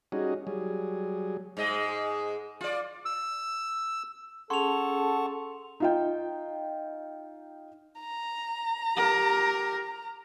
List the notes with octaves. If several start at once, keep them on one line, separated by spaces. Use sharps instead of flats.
G3 C#4 D#4 F#4 G#4
F#3 G3 G#4
G#2 G#3 D#5
F4 D5
E6
C#4 G#4 A4 F#5 A5 C6 C#6 F7
D#4 F4 G5
A#5
G4 A#4